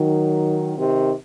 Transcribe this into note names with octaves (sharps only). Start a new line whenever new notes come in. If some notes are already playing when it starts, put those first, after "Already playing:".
Already playing: D#3 F#3
C3 D#3